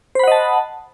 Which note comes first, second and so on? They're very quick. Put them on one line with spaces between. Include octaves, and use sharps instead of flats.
C5 B5 F#5 D#5 A5